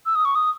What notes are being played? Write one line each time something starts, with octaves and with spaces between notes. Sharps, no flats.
E6
D#6
C#6
D#6